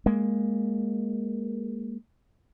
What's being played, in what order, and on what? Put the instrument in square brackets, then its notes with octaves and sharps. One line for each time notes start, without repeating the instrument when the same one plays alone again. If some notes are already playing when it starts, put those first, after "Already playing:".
[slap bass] G#3 A#3